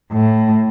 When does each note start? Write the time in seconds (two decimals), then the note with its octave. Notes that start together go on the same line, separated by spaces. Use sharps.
0.12 A2